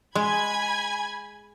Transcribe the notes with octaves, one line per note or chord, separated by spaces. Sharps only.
G#3 G#5 B5 G#6